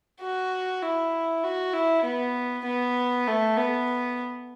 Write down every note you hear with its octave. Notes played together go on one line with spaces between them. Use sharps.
F#4
E4
F#4
E4
B3
B3
A3
B3